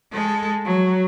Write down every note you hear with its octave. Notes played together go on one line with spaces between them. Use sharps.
G#3 A4
F#3